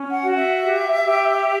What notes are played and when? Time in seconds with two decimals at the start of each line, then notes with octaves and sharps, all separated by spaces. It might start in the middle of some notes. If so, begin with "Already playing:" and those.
Already playing: C#4
0.09 F#5
0.23 F#4
0.36 E5
0.64 G4
1.04 G4